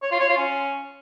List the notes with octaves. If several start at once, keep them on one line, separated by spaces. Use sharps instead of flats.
C#5
F4
C#5
F4
C#4